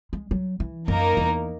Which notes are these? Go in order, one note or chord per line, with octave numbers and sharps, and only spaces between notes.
G#3
F#3
E3
F#2 A#3 D#4 A#4
E2